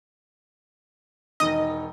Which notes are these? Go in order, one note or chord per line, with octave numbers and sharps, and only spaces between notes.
E1 D#3 D#4 D#5